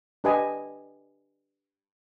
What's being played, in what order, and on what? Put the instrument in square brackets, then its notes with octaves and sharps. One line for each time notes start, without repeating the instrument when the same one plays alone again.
[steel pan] D4 G4 B4 D#5 G#5